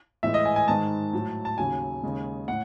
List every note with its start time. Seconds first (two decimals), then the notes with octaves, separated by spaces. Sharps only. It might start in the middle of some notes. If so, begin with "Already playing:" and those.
0.23 A2 E3 G#3 E5
0.34 D#5
0.45 G#5
0.56 G#5
0.68 G#2 D#3 G#3 A5
1.13 A2 F#3
1.45 A5
1.58 D#2 C#3 F#3 G#5
2.03 D#2 C#3 G#3
2.48 A2 F#5